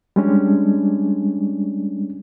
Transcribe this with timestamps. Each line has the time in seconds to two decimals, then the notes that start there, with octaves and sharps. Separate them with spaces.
0.16 G3 G#3 C#4 D4